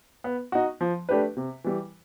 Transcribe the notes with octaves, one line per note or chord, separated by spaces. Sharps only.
B3
D#4 F#4
F3
A3 D4 G4 B4
C3
E3 G3